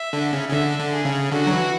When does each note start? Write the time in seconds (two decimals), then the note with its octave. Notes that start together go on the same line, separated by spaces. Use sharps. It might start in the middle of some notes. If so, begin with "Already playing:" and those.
Already playing: E5
0.13 D3
0.33 C#3
0.48 C#3
0.52 D3 E5
0.79 D3
0.92 G#4
1.05 C#3
1.31 D3 F#4
1.47 F#3
1.52 E3